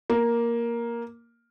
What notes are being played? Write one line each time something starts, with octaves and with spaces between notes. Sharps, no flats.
A#3